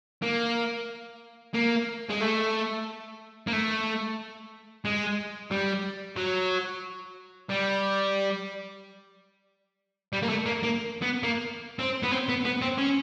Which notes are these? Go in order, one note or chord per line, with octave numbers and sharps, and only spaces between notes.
A#3
A#3
G#3
A3
A#3
A3
G#3
G3
F#3
G3
G3
A#3
A3
A#3
A#3
B3
A#3
C4
B3
C4
B3
B3
C4
C#4